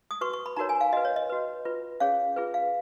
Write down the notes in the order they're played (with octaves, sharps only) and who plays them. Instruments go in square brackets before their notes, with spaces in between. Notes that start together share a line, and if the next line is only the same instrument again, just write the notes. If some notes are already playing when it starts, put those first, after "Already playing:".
[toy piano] D#6
F#4 B4 C#6
C#6
B5
D#4 F#4 A#4 C#5 A#5
G#5
F5
F#4 B4 D#5
C#5
D#5
F#4 B4
F4 B4
C#4 G#4 C#5 F5
F4 G#4 B4
F5